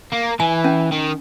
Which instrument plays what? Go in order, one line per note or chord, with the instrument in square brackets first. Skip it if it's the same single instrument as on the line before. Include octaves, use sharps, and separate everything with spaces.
[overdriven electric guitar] A#3
[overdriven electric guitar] E3 [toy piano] G#5
[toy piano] C#4
[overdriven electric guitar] D#3